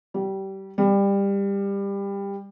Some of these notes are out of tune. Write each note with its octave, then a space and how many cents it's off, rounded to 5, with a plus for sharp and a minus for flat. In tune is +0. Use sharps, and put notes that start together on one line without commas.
G3 -25
G3 +20